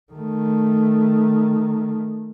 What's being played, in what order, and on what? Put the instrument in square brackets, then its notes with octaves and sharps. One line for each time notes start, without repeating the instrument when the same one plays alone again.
[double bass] D#3 A3